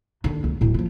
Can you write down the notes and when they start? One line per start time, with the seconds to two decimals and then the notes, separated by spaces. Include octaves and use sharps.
0.24 D#2 D3
0.44 C#2
0.61 D1 A2
0.74 F3 F4